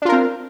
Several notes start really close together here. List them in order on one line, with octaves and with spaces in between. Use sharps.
D4 F4 A#4 C4